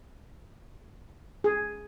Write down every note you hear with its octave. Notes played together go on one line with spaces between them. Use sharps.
G#4